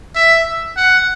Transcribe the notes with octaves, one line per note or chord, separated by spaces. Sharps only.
E5
F#5